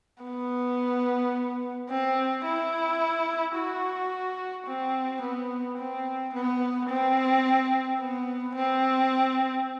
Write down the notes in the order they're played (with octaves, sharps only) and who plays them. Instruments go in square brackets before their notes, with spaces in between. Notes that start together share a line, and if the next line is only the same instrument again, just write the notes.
[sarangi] B3
C4
E4
F#4
C4
B3
C4
B3
C4
B3
C4